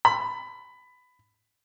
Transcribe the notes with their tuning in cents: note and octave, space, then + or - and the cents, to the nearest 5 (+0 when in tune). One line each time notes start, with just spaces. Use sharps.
B5 +15